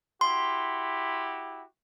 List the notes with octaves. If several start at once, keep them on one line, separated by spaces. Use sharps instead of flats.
E4 F#4 G4 C6